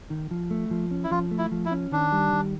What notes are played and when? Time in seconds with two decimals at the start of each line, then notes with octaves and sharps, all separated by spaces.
0.10 D#3
0.31 F3
0.51 A3
0.71 F3
0.91 C#4
1.04 E4
1.11 F3 F4
1.31 A3
1.38 E4
1.51 F3
1.65 E4
1.71 C#4
1.92 D#3 D4
2.12 G3
2.32 D#3